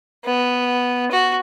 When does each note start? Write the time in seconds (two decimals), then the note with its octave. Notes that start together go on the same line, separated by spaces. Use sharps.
0.25 B3
1.12 F#4